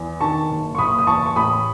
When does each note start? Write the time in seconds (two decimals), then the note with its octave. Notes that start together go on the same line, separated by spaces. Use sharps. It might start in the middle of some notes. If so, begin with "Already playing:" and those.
Already playing: E2
0.20 D#3 A5 C#6
0.50 F#1
0.75 C#6
0.78 F#1 B5 D#6
0.99 D#6
1.06 E2 A5 C#6
1.26 C#6
1.36 A1 B5 D#6